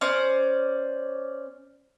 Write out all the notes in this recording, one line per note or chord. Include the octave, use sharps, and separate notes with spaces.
C#4 C5 D5